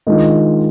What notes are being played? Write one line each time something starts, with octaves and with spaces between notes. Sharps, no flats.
D#3 G#3 D4 F4